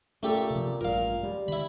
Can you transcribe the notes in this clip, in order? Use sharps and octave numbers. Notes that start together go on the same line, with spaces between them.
A#2 A3 C#4 G4 A4
C3 F3
A1 G2 A#2 A#4 F5
G3 G#3
D3 D#3 E4 B5